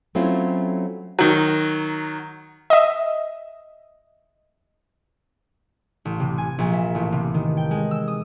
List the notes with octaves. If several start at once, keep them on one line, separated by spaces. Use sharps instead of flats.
F#3 A3 C4 C#4 E4 F4
D#3 F#3
D#5 E5
A1
C3
G#5
A#1
E5
A1
C3
D#3
G5
G#3
E6
D#6